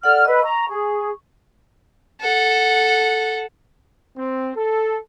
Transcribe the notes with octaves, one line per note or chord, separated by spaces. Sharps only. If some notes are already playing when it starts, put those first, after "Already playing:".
A4 D5 F#5 F6
B4 D#5 E6
A#5 C#6
G#4
A4 F#5
C4
A4